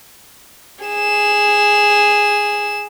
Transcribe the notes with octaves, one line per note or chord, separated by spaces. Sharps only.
G#4 E7